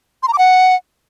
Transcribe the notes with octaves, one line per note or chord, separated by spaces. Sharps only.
C6
A#5
D6
F#5